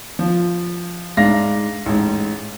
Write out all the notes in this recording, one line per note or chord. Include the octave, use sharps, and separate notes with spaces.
F3
G#2 D4 F5 A#6
A1 G#2